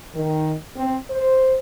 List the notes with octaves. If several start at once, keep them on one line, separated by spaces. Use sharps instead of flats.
D#3
C4
C5